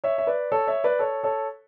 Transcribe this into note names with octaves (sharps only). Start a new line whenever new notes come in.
C#5 E5
E5
B4 D5
A4 C#5
C#5 E5
B4 D5
A4 C#5
A4 C#5